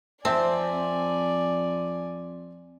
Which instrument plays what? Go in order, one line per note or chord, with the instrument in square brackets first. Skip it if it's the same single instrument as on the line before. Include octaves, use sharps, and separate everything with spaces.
[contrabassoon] F2 [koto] C4 [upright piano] C5 E5 A5 [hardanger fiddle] D5 G#5